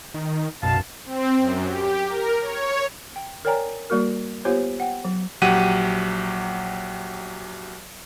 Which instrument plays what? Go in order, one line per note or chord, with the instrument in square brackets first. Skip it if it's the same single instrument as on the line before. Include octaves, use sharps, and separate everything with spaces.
[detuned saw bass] D#3
[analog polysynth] B1 F#2 [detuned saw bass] B2 [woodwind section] F5 A5
[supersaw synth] C4
F#2
G4
A#4
C#5
[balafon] G5
A#4 C#5 D5 G5 G#5 A#5
G3 A#3 F#4 A#4
B3 F4 G4 C5 C#5 G#5
F#5 G5
F#3
[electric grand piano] A#1 F#3 G4 F#5 D#7